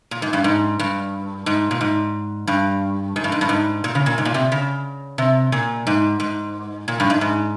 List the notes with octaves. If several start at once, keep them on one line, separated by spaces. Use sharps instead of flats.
A#2
G#2
G2
G#2
G2
G#2
A#2
G#2
G2
G#2
G2
G#2
G2
G#2
A#2
C#3
A#2
G#2
A#2
C3
C#3
C3
A#2
G#2
G#2
A#2
G2
G#2
G#2